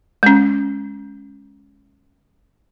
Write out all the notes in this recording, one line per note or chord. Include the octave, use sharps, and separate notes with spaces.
G#3 C#4